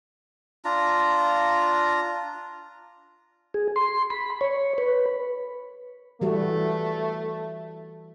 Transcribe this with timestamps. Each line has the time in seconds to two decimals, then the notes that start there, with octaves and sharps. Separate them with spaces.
0.65 D4 F4 A#5
3.54 G#4
3.76 C6
4.10 B5
4.41 C#5
4.78 B4
6.21 E3 G3 A3 F#4